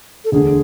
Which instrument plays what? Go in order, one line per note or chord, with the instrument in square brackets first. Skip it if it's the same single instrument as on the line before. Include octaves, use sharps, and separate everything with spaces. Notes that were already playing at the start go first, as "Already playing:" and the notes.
[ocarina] A4
[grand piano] E1 D2 D3 [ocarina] G#4